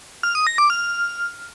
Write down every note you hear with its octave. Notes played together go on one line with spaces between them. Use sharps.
F6
D#6
A#6
D6
F6